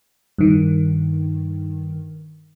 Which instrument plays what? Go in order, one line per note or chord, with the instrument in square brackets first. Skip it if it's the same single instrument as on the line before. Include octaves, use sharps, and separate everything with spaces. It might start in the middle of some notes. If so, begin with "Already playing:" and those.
[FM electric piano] G2 D#3